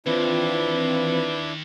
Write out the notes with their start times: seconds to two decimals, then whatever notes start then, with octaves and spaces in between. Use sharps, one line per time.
0.06 D#2 E3 C4 D4 E4 F4 B4